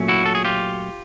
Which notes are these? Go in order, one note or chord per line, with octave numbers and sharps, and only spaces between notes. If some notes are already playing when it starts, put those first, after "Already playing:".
Already playing: A#2 F#3 A3 C#4
E4 F#4
A4
G#4
F4 G4